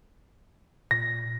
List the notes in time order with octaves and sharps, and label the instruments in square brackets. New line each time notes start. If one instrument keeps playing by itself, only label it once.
[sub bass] A#2 [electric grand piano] A#6